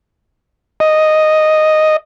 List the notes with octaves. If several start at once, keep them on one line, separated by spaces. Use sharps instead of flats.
D#5